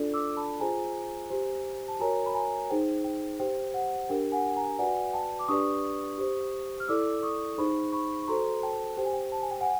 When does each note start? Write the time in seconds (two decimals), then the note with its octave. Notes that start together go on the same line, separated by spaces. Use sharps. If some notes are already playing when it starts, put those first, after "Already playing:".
Already playing: D4 F4 A4 D5
0.14 D6 E6
0.37 A5 B5
0.60 F4 G#4 C5 G#5 A#5
1.30 G4 C5
1.88 A5
1.99 F#4 A#4 C#5 G#5 A#5
2.26 B5
2.34 G#5 A#5
2.70 D#4 G#4 C5 G5
3.04 G5
3.39 G4 C5 G5
3.74 F#5
4.09 D4 G4 A#4 G5
4.32 F#5 G#5
4.56 G#5 A#5
4.78 F#4 B4 D5 F#5 G#5
5.13 G5 A5
5.39 D6
5.48 D4 G4 B4 D5 C#6 D#6
6.18 G4 C5
6.80 F6
6.88 E4 A4 D5 D6 E6
7.23 C#6 D#6
7.58 D#4 G#4 C5 B5 C#6
7.92 B5 C#6
8.23 C#6
8.28 F#4 A4 C5 A#5 C6
8.63 G5 A5
8.97 G4 C5 G5
9.05 G#5
9.13 G5
9.32 A5
9.42 G#5
9.51 G5
9.61 F#5 G#5